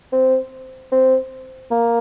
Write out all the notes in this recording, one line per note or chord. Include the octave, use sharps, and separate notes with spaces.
C4
C4
A#3